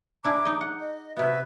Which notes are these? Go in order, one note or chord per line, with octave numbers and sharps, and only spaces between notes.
D4 E4 G#4 A#5 D6
D#4 D#5
F#5
D#5
C3 B3 F#4 B4 E5